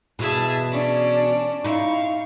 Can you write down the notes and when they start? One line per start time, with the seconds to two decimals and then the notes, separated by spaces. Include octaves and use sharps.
0.19 B2 E3 G#4 E5 A5
0.70 C#4 D4
1.64 D#4 E4 F5 C#6